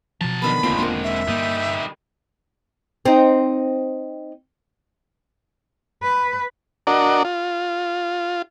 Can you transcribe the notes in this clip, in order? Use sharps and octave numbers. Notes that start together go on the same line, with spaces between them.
B2 F3 F#3 A5
D3 D#3 B3 B5
F1 G#3 A#3 C4 F4
E1 A#3 D4 A#4 F#5
E5
G2 G3 A#3 D#4
C4 D#4
B4
D4 F#4 A#4 D5 D#5
F4